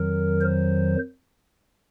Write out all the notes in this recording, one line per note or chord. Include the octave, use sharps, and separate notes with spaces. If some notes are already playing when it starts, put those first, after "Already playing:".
Already playing: F2 D#3 F#3 A#4
C5